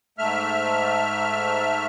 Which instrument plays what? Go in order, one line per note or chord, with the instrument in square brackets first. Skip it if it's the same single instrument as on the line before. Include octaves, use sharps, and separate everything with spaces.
[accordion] G#2 A3 E5 F6